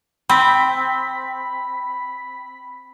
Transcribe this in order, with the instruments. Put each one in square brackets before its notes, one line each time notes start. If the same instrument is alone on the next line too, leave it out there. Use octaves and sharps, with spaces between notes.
[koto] C4 [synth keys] B5 B6